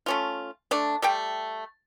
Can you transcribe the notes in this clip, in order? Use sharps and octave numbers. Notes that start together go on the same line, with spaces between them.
A3 C#4 F4
A3 D4
G3 A3 G5